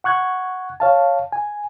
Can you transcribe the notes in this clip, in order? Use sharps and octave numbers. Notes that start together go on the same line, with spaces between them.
F#5 C#6 F#6 G#6
C#5 F5 A5
G#5